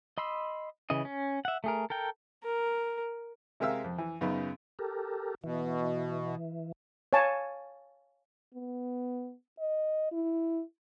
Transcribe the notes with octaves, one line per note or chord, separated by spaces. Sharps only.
D#5 B5 C6 E6
C#3 E3 D#5
C#4
E5 F#5
A3 G#4 A#4
A4 A#4 G5
A#4
C3 G#3 A#4 E5 F5 E6
F2
E3
F#2 C#3 B3 D#4
G4 A4 A#4
B2 E3
C#5 F5 G#5 A5
B3
D#5
E4